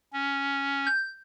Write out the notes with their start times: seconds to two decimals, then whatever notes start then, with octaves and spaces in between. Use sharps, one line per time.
0.13 C#4
0.87 G6